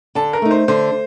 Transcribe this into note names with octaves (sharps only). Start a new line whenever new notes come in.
D3 A5
A#4
A3 D#4
C5
D3 C5